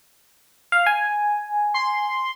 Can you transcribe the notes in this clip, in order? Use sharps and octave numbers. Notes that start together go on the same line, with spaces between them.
F5
G#5
C6